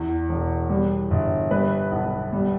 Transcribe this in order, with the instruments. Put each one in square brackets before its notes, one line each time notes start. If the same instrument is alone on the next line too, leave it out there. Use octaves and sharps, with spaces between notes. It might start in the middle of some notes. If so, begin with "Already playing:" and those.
Already playing: [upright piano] E2
E1
G3
G1
G3 B4
B1
G3